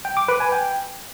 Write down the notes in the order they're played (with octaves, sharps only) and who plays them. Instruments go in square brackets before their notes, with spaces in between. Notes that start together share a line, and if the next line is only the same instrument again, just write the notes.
[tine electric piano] G5
D6
B4
G#5
G5